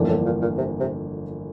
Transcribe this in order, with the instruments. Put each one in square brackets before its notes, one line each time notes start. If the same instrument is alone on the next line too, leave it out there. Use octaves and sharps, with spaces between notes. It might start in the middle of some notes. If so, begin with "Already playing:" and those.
Already playing: [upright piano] G1 F2 E3 A#3 D4
[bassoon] A2
A#2
A#2
C3
C3